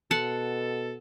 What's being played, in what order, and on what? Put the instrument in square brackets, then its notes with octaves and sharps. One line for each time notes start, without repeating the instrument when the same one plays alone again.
[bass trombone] B2 [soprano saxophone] A4 [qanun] F#5 A5 C6